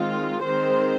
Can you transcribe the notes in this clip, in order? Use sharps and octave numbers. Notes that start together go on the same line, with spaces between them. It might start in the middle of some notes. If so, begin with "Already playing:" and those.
Already playing: D#3 G#3 C4 F4
D#3 G#3 C4 C5